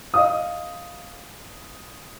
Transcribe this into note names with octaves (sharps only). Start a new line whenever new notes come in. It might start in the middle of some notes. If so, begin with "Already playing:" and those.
D#5 F5 D#6